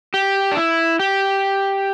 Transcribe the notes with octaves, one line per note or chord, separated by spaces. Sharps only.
G4
D4
E4
G4